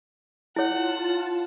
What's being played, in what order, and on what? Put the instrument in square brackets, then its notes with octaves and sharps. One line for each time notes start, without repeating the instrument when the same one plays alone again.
[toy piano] E4 C#5 [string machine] F4 A5 [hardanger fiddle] F#5